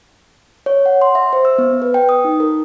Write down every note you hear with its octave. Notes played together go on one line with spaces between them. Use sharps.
C#5
F#5
C6
E5
C5
E6
B3
B4
G5
D#6
D#4
A#4